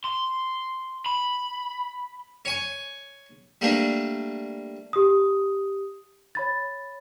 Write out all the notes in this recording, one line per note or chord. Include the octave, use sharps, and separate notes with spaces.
C6
B5
C#5 G#5 C#6
G3 A3 A#3 D4
G4 D#6
C#5 B5 A6